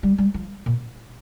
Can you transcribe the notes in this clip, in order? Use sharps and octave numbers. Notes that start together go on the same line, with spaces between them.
G3
G3
F3
A#2